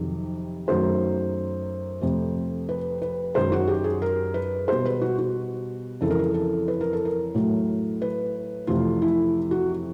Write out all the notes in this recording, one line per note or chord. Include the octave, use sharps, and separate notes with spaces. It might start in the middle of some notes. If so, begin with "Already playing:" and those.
Already playing: F2 C3 D#3 F#3
F#2 D#3 F#3 A3 C5
F2 C3 F3 A3
B4
B4
F#2 D#3 G#3 C5
F#4
G4
G#4
A#4
B4
B2 G3 C5
B4
F#4
F#4
F2 C#3 E3 G#3 A4
A#4
A4
A4
B4
A#4
A4
A#4
A2 F#3 A3
B4
F2 C3 E3 A3 F4
E4
F#4